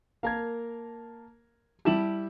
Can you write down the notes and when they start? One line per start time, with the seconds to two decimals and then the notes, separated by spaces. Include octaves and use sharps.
0.23 A#3 A#4 F5 A5 G#6
1.85 G3 E4 G4 A5 E7 F#7